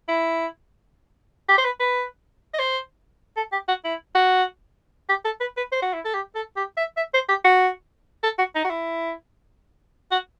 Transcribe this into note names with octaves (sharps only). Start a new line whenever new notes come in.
E4
G4
C5
B4
B4
D#5
C5
A4
G4
F#4
E4
F#4
G4
A4
B4
B4
C5
F#4
E4
A4
G4
A4
G4
E5
E5
C5
G4
F#4
A4
F#4
D#4
F#4
E4
F#4